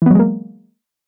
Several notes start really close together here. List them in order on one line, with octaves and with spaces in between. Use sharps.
E3 B3 F#3 G#3 A#3